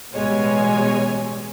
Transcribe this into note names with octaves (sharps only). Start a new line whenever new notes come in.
A1 B2 G3 G#3 C#5 G#5